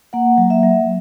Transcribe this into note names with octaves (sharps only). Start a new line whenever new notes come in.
A#3 F#5
F#3
E5
F#3